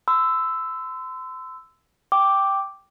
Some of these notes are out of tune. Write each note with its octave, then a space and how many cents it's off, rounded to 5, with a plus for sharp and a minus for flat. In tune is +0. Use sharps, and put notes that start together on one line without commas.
C6 -40 E6 +0
G5 +0 D6 +0